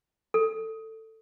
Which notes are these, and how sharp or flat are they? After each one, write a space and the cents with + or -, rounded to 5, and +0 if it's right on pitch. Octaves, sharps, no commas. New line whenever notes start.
A4 +15